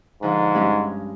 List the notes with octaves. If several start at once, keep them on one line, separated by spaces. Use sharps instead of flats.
G#2 D3 F3
G2 G#3 C#4